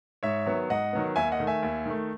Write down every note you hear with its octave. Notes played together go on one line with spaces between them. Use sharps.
G#2 C#5 E5
D#3 F#3 B3
G#2 D#5 F#5
D#3 F#3 B3
D#2 E5 G#5
D#5 F#5
D#3 A3
E5 G#5
D#2
D#3 A3